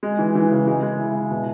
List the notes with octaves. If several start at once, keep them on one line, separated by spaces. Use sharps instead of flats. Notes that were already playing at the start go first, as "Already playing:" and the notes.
G#3
E3
E3
C#3
G#3
G#3
E4
E4
B2